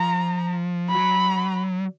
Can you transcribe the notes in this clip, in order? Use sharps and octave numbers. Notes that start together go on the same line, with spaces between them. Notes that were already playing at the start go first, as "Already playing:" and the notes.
Already playing: F3 A#5
F#3 B5